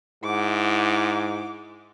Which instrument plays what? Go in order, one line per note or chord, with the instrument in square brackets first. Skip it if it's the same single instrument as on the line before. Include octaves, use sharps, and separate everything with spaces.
[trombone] G#2 [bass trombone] E4 [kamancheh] F#5 D6